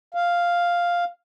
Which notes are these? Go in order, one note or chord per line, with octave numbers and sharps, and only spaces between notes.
F5